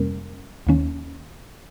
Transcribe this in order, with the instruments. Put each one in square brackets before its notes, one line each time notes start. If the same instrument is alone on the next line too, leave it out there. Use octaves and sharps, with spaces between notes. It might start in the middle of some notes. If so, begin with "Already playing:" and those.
Already playing: [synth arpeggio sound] F2 C3 G3 A#3 C#4 A#4
D#2 D#3 A#3 C#4